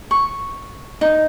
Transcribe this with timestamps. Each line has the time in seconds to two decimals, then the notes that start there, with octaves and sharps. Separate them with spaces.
0.11 C#6
1.01 D#4